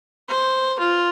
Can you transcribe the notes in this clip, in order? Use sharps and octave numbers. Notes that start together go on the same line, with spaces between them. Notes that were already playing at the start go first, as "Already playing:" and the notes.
C5
F4